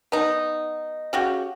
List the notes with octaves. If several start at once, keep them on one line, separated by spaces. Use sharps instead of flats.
B3 D#4
C#3 F#4 G4